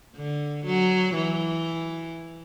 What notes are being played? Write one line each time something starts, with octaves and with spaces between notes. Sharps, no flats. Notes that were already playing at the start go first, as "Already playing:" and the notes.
D3
F#3
E3